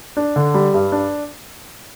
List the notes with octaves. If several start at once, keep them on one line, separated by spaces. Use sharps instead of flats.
D4
D3
G3
G2
D4